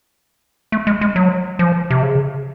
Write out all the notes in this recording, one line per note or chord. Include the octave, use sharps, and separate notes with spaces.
A3
G#3
G#3
F#3
F3
C3
C#3